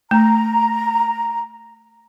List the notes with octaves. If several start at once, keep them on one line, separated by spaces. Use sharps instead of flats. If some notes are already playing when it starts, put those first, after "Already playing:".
A3 A#5